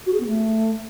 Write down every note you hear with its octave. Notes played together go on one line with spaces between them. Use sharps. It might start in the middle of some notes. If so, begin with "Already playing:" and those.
F#4
G#4
B3
A3